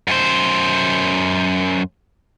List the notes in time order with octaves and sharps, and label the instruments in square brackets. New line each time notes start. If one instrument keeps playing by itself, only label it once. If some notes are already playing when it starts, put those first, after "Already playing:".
[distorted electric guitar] F#2 C5